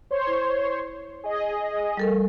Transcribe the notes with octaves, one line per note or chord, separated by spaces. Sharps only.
C5 C#5 C6
E4
G#4 D#5
G3 A4 A#4